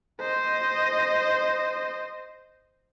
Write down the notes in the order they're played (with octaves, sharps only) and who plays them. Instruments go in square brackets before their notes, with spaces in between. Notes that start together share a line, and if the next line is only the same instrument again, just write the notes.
[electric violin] C5 D#5